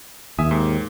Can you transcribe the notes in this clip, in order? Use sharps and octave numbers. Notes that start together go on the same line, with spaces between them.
D#2 E5 G#5 D#6
G#2